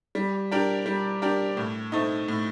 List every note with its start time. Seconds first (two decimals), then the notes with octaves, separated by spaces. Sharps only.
0.15 G3
0.51 D4 G4 A#4
0.86 G3
1.22 D4 G4 A#4
1.57 A2
1.92 A3 C4 D#4
2.28 A2